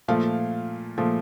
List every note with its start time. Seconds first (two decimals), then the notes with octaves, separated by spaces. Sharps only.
0.08 A#2 F3 A3 F5
0.98 A#2 F3 A3